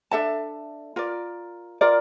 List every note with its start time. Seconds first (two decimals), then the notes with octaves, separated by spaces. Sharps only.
0.11 D4 A4 E5 A5
0.96 F4 A#4 D5
1.81 F4 A#4 D5